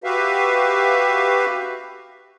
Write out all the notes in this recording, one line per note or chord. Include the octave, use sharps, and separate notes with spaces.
F#4 G4 B4 E5 F5